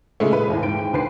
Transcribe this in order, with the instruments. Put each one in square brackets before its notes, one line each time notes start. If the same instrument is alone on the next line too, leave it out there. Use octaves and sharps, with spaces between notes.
[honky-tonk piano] A#2 C#3 G#3 A3
B4
G#1 D#2 E3
G#2 G5 D7
G5
D#2 D3 B4 C5 C7